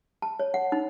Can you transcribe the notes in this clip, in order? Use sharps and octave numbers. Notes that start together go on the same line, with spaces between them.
A5
C#5
F#5
D#4